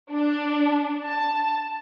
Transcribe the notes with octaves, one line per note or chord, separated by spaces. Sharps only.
D4
A5